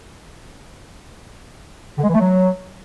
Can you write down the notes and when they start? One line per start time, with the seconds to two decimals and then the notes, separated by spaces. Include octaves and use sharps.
1.98 D3
2.03 G#3
2.09 E3
2.14 A3
2.19 F#3